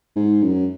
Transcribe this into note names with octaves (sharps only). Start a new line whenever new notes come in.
G#2
F#2